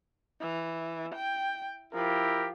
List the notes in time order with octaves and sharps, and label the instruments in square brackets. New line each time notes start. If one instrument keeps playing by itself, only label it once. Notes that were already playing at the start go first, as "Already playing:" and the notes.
[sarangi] E3
G5
[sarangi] F3 [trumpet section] E4 G4 A#4